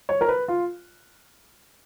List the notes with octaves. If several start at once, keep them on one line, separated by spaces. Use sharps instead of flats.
C#5
A#4
B4
F4